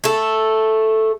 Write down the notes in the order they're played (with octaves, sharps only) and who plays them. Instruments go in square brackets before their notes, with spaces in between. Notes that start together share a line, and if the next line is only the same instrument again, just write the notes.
[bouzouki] A3 A4